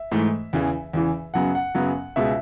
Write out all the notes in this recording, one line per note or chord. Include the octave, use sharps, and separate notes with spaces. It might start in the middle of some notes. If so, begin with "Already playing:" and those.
Already playing: E5
G#2 E3 A3
E2 C#3 E3
E2 C#3 E3
F#2 C#3 F#3 B3 F#5
F#5
F#2 C#3 F#3 B3
C#2 B2 G#3 E5